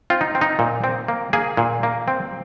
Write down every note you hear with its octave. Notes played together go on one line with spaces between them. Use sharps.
C4 F4
D#4
C4
D#4
A#2
C4
A#3
A#3 G#4
A#2
A#3
C4